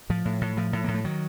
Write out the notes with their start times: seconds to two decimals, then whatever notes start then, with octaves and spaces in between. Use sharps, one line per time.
0.09 A2 F3
0.25 A2
0.41 A2
0.57 A2 F3
0.73 A2
0.84 A2 A#3
0.95 A3
1.05 D#3 F#3